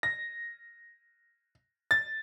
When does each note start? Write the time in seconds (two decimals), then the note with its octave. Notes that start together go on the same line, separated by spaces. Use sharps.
0.03 A#6
1.91 A6